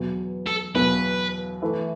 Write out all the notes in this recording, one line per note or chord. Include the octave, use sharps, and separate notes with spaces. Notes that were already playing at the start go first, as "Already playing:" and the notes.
Already playing: E2 B2 F#3
A4
E2 B2 F#3 B4
E3 A3 E4 B4